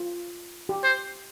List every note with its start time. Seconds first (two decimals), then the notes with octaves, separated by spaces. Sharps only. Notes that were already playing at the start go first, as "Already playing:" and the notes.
Already playing: F4
0.69 G4
0.84 C5